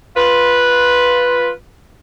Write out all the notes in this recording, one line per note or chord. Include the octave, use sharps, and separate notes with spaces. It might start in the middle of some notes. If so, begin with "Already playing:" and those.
F4 B4